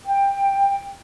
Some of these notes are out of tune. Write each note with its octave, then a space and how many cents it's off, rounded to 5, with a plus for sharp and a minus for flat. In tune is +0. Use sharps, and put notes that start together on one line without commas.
G5 +15